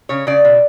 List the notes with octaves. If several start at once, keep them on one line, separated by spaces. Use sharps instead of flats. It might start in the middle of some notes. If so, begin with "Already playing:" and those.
C#3 C#5
C#3 D5
B2